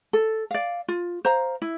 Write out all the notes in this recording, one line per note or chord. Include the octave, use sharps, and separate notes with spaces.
A4
D5 F5
F4
C5 F5 A#5
E4